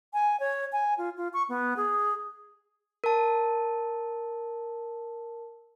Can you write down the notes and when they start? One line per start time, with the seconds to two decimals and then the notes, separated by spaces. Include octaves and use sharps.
0.13 G#5
0.40 C#5
0.72 G#5
0.98 F4
1.17 F4
1.34 C#6
1.49 B3
1.77 G#4
3.04 A#4 A5